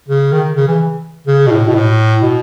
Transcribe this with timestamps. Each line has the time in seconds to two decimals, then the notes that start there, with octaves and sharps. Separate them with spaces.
0.08 C#3
0.32 D#3
0.56 C#3
0.68 E3
1.27 C#3
1.47 B2
1.51 A2
1.68 B2
1.75 A2
2.22 B2